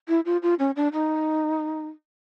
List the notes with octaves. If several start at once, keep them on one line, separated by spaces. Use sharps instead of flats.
E4
F4
F4
C#4
D4
D#4